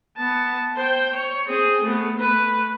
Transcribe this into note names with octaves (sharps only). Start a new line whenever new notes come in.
B3 A5
C5 G5
C#5
C4 G#4
A3 B3
A3 B4